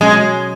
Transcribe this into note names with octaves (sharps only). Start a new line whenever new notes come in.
B2 F#3 G#3 C#4